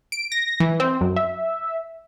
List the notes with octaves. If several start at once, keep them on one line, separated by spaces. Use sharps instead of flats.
D7
A#6
E3
C4
F#2
E5